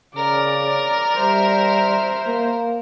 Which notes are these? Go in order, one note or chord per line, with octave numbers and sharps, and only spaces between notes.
C#3 A#4 D5
G3 C5 E5
A#3